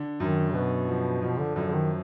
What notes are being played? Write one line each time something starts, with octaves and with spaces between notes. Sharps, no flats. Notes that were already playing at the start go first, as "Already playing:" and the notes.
Already playing: D3
F#2 D#3
B2 B3
F3
B2 F3
D3
F#2 D3
D3
D#3